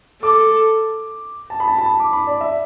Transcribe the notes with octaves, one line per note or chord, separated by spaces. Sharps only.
A4 D6
A5
B5
A5
A5
B5
D6
B5
D5
E5